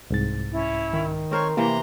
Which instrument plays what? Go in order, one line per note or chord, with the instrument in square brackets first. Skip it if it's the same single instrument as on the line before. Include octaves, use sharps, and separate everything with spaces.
[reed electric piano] C2 G#2 A6
[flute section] C#4 E4
[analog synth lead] D#3
[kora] C4 A#4 C5 [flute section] C#5 C#6 F6
[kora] C3 E3 C4 [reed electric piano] A#3 [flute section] A#5 C6